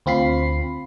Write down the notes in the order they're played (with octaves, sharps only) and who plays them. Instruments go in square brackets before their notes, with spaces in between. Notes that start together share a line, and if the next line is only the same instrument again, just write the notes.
[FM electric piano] D2 C4 F4 B5 C7